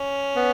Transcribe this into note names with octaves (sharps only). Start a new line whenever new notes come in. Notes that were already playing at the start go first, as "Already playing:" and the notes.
Already playing: C#4
B3